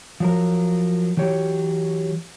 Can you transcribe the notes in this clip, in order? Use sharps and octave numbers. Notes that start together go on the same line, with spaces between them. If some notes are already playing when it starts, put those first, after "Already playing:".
F3 F#3 A#4
E3 F#3 G4 C#5